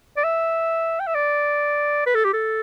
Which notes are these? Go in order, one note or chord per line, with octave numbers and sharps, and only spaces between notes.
D5
E5
G5
E5
D5
B4
A4
G4
A4